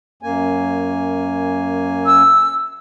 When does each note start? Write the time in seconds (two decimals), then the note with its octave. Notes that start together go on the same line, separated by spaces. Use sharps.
0.23 F#2 A#3 G#5
2.06 E6